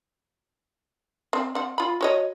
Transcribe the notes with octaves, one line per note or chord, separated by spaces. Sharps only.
C4
C4 F#5
F4 B5
F#4 C#5 D#5